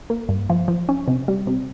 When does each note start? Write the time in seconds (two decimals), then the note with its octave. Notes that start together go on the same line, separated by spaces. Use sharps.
0.10 A#3
0.29 G2
0.50 F3
0.68 F3
0.89 C#4
1.08 C3
1.28 G3
1.47 C3